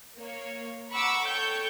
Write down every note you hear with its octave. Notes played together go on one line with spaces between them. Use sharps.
A#3 C#5
F#5 A#5 B5 C#6 D6 E6
A4 C#5 G5 C#6 G6